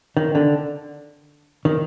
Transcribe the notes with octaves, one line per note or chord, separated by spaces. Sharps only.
D#3
D3
D#3